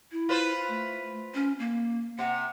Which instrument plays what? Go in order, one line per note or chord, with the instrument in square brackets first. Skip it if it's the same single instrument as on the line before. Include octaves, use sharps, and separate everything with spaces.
[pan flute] E4
[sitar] F4 B4 C5
[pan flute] A3
C#4
A#3
[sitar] C3 [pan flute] F#5